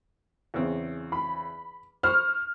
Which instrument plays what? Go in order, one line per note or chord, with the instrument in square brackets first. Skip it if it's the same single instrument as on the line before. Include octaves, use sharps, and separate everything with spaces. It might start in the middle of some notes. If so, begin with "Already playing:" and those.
[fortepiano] E2 C#3 C4
[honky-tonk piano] B5
[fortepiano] C5 B5 C#6 [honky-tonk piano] F6